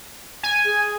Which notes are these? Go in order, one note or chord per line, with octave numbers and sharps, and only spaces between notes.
G#5
G#4